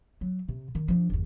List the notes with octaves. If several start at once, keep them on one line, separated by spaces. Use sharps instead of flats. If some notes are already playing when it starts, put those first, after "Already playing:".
F#3
C3
D#3
F3 D4
F#1 D#2